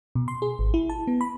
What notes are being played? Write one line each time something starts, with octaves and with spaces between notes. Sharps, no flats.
B2
C6
G#4
G#1
E4
A5
B3
B5